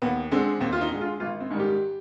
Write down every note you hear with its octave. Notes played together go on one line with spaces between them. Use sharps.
D#2 B3
D3 G#3 C4
D#2 C4
F4
D#4
D3 G#3
F4
G#1 F4
C4
G#2 D#3 G3
G4